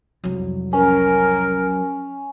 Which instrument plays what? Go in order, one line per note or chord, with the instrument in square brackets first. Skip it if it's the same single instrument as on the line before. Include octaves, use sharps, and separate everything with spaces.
[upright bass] C2 F2 [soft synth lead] F#3
[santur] C#4 [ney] A#4